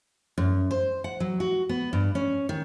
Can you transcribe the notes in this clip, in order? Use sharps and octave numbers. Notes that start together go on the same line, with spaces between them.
F#2
C5
F#5
F#3
F#4
B3
G2
C#4
D#3